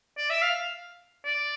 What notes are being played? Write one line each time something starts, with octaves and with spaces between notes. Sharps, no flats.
D5
E5
F5
D5